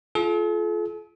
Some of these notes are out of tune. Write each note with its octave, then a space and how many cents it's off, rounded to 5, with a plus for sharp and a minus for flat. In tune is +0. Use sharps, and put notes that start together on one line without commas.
F4 -15 A4 -45